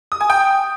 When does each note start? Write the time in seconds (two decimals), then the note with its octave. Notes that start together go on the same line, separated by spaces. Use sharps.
0.12 D#6
0.21 G#5
0.30 G5